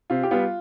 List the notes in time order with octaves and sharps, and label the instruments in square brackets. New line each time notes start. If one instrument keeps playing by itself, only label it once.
[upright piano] C3 F4
G4
G3 B3 F4